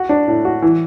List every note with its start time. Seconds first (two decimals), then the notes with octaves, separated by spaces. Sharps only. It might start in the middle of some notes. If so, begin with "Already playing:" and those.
Already playing: F#4
0.09 D4
0.28 A2
0.45 F#4
0.62 E3